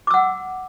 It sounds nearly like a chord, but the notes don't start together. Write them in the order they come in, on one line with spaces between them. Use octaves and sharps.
D6 E6 F#5